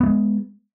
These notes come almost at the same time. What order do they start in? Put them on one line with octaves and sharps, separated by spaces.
B3 A3 G#3